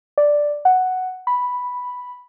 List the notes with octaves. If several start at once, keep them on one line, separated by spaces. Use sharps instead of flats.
D5
F#5
B5